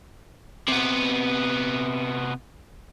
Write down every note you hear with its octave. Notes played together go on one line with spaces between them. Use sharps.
C3 B3